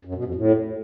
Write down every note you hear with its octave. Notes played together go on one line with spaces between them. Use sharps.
F#2
B2
F2
A2